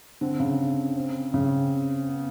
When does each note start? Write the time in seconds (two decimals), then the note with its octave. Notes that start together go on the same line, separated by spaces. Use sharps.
0.21 D3 C4
0.40 C#3
0.96 C4
1.34 C#3
2.08 B3